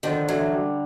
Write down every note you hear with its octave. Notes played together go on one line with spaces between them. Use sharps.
D3 D#3 F3
D3 E3 F#3
G3